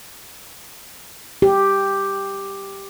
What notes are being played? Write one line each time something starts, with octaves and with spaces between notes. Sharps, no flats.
G4